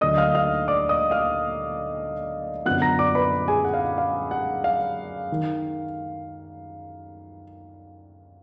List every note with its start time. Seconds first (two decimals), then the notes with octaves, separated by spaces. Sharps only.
0.01 D2 D3 F#3 D4 D#5 D#6
0.18 F5 F6
0.35 F5 F6
0.68 D5 D6
0.89 D#5 D#6
1.11 F5 F6
2.66 F#2 D3 F3 B3 F#5 F#6
2.82 A#5 A#6
2.99 D5 D6
3.15 B4 B5
3.48 G#4 G#5
3.65 F#5
3.74 F5
3.81 F#5
3.98 F5
4.31 F#5
4.64 F5
5.32 D#3